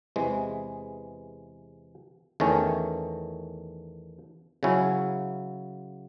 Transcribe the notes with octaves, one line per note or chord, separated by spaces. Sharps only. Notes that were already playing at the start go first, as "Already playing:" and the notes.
E2 C3 E3 G#3
E2 D#3 A3 C#4
C#3 F#3 C#4 E4